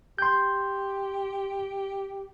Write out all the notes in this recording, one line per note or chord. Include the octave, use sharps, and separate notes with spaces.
G4 C6 G6